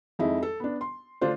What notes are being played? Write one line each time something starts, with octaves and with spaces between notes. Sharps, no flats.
F2 G#3 D#4 E4
A4
B3 D4
C6
D3 A3 D4 F4 C5